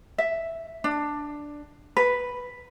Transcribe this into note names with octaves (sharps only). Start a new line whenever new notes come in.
E5
D4
B4